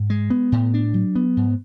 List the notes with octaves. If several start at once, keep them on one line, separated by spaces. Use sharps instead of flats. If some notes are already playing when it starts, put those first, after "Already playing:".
Already playing: G#2
G#3
B3
A2
D4
F#3
B3
G#2